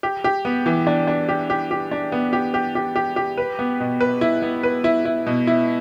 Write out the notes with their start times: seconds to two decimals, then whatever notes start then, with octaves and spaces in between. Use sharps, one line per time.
0.03 G4
0.24 G4
0.45 B3
0.66 E3
0.87 D4
1.07 D4
1.29 G4
1.50 G4
1.71 G4
1.91 D4
2.12 B3
2.33 G4
2.54 G4
2.75 G4
2.96 G4
3.16 G4
3.37 B4
3.59 B3
3.80 B2
4.01 B4
4.21 E4
4.42 B3
4.63 B4
4.84 E4
5.05 E4
5.26 B2
5.47 E4